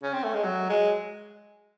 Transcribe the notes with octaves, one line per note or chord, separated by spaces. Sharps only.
C#4
C4
A3
G#3
F#3
G#3